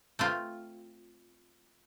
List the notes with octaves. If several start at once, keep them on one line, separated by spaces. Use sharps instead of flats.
A3 C4 F4